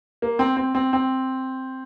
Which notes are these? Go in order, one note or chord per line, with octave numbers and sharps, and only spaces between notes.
A#3
C4
C4
C4
C4